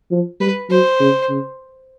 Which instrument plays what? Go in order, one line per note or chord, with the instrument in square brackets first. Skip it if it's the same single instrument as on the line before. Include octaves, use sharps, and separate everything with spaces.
[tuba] F3
[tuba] G3 [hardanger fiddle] B4
[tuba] F#3 [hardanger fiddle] C5
[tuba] C#3
C#3